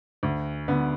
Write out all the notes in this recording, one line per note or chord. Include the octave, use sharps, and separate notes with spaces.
D2
D3 B3